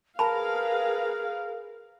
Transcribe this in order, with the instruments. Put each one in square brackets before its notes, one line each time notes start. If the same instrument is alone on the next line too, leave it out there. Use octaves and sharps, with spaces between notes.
[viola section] G#4 B4 F5 [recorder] A#4 [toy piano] A5 B5